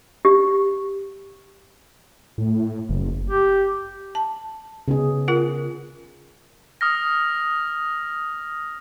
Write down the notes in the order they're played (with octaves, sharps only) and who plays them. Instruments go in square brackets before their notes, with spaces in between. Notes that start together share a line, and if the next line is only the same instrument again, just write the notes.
[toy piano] G4
[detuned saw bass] A2
A2
F#1
[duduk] G4
[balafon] A5
[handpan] C#3 B3 G#4
[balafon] F4 A#4 F#5
[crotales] D#6 F6 A#6